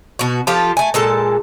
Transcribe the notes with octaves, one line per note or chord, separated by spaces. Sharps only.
B2 F#4
F3 F4 G4 A4
A3 G#5
A#2 G#3 A4 A5